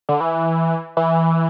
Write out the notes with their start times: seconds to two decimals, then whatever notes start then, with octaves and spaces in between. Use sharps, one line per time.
0.09 D3
0.20 E3
0.97 E3